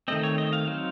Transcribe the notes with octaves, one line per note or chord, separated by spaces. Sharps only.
D#3 A3 C4 D#5
C#5
D#5
F5
F#3 C4 D#4 F5